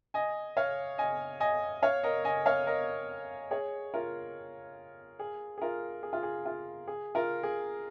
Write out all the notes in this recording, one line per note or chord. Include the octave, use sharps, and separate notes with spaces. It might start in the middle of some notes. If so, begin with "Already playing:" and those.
D#5 G#5
C#5 F5
D#5 G#5
D#5 G#5
C#5 F5
A#4 D#5
D#5 G#5
C#5 F5
A#4 D#5
G#4 C#5
F4 A#4
G#4
G#4
F4 A#4
G#4
F4
G#4
F4
G#4
F4 A#4
G#4